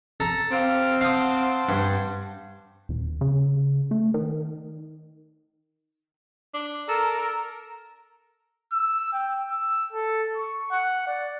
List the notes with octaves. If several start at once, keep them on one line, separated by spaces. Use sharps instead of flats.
A4 A#5
C4 G4 F5
C5 F5 F#5 A5 D#6
G2
D#1
C#3
A3
D#3
D4
A4 A#4
E6
G5
E6
A4
C#6
F#5
D5